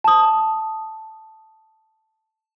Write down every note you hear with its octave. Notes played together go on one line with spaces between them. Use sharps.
A5 D#6